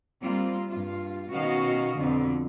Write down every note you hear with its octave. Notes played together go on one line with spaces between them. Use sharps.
G3 A#3 C4 F4
G2 F4
B2 D#3 C#4 F#4 D#5 F5
F2 B2 D3